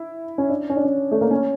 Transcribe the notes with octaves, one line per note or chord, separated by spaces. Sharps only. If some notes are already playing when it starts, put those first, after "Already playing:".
Already playing: E4
C#4
D4
C#4
D4
C#4
A3
A#3
C#4